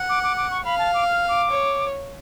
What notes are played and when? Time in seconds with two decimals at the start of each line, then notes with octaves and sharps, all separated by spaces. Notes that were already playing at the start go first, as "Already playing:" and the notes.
Already playing: F#5
0.09 D6
0.23 D6
0.37 D6
0.51 C#6
0.65 F5 B5
0.79 A5
0.94 D6
1.07 F6
1.28 D6
1.50 C#5